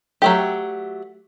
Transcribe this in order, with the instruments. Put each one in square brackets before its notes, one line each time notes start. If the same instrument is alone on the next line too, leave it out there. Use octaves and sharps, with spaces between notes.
[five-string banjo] F#3 A3 G4